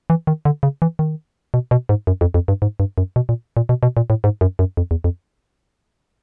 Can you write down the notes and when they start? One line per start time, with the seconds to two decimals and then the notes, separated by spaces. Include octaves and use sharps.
0.10 E3
0.27 D#3
0.45 D3
0.63 C#3
0.82 E3
0.99 D#3
1.54 B2
1.71 B2
1.89 G#2
2.07 F#2
2.21 F2
2.34 F2
2.48 G2
2.62 G#2
2.80 G2
2.98 F#2
3.16 B2
3.29 A#2
3.57 A#2
3.69 B2
3.83 B2
3.97 A#2
4.10 A2
4.24 G#2
4.41 F#2
4.59 F#2
4.77 F2
4.91 E2
5.04 F2